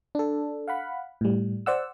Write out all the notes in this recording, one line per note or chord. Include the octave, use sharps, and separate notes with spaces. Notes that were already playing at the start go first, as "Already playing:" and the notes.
D4 A4
F5 F#5 B5
A2 G3
C5 D5 F#5 E6